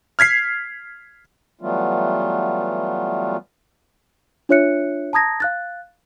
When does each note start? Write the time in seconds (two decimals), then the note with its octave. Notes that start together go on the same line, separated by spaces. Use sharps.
0.19 F6 G#6 B6 C7
1.61 E3 F#3 G3 A3 B3 F4
4.49 D4 F4 C#5 E5 F#6 C#7
5.13 A5 A#5 D#6 G#6 A#6
5.40 F5 F#6 A6